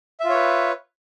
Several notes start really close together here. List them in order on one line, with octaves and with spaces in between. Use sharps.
E5 F4 C#5 B4